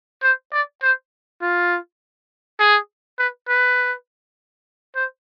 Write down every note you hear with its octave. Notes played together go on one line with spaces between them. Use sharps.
C5
D5
C5
F4
G#4
B4
B4
C5